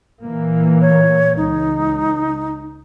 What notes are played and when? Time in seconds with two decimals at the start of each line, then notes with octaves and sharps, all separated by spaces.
0.21 A#2 E3 A#3
0.81 C#5
1.37 C#2 D#4